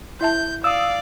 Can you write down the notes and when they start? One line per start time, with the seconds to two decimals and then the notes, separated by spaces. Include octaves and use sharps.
0.21 E4 E5 A5 G6
0.64 D5 F5 D#6 E6